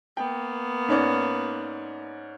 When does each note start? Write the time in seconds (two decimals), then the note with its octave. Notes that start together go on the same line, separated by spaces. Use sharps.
0.17 A#3 B3 G5
0.88 G#2 C#4 D5